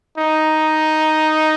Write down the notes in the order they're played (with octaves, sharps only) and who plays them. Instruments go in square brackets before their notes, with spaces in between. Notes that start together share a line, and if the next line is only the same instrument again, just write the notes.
[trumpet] D#4